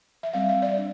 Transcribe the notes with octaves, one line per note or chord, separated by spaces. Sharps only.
E5
G3 C4 F5
E5
D5
D4